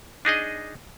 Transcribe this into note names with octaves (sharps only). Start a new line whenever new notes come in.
D4 D#4 G#4 D#5